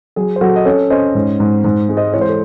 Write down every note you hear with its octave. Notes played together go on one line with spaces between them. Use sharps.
F#3 G#4
C5
F#3 F#4 A4
D#5
C#4 A4 C#5
C#4 C5 D#5
G#2
G#2
G#2
G#3
C5 D#5
E3 C#5
C5
A4